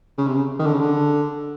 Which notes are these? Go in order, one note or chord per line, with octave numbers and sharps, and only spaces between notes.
C#3
C3
C#3
D#3
D3
C#3
D3